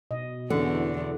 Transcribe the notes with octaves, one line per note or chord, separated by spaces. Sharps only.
B2 D#5
E2 D3 E3 C#4 D4